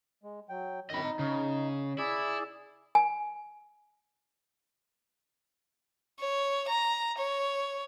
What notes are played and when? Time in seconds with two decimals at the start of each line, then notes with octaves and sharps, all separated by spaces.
0.23 G#3
0.49 F#3 G5
0.90 F#2 D#3 D#5 B5
1.04 D#4
1.19 C#3
1.98 E4 G#4 D5 E6
2.95 G#5
6.19 C#5
6.68 A#5
7.18 C#5